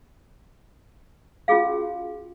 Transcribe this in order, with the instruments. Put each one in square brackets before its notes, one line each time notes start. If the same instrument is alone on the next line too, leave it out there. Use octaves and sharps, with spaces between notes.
[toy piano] C#4 F4 F#4 G#4 F5